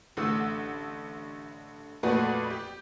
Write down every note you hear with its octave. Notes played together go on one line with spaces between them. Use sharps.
A1 D3 A3 F#5 E6
F2 A#2 A3 F#4 B4 D5
G4